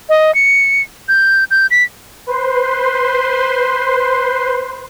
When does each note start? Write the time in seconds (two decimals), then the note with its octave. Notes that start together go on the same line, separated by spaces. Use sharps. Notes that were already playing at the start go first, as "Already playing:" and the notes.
0.09 D#5
0.35 C#7
1.08 G6
1.51 G6
1.71 B6
2.27 B4 C5 C6